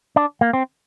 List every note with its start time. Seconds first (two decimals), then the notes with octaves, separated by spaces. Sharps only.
0.16 D4
0.41 A#3
0.53 C4